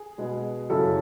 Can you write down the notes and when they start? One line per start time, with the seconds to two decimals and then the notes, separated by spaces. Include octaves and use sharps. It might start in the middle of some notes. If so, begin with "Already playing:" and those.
Already playing: G#4
0.18 B2 G#3 B3
0.70 F#2 C#3 F#3 C#4 E4 A4